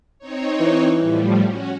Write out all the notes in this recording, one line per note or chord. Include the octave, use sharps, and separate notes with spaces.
C4 D#4 C#5
E3
A2 F3 G3
C#4 F#4